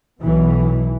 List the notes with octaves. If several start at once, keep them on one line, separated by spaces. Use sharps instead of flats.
B1 B2 E3